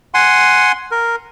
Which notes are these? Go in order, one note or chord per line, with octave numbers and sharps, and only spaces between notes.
F#5 G#5 C6
A#4